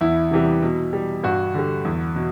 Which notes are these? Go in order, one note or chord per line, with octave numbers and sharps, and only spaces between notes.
E2 E4
C3 E3 G3
B2
G3
G2 F#4
D3 G3
E2
B2